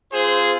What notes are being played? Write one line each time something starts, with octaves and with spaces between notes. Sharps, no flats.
C4 F4 G#4 C5